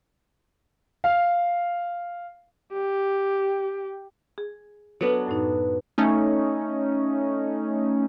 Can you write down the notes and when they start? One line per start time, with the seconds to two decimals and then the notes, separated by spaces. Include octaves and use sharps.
1.04 F5
2.73 G4
4.38 G#4
5.01 F#3 B3 D4 A4
5.27 F#2 A2 D#4
5.98 A3 C#4 D#4